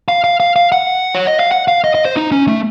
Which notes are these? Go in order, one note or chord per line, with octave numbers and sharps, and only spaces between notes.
F5
F5
F5
F5
F#5
C#5
D#5
F5
F#5
F5
D#5
D#5
C5
D#4
C#4
A3